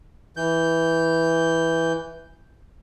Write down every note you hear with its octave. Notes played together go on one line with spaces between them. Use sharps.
E3 G6